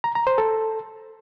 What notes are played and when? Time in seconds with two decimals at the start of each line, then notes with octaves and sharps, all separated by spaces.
0.04 A#5
0.15 A#5
0.27 C5
0.38 A4